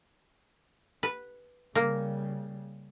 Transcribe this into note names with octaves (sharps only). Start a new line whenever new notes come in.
B4
C#3 G3 A#3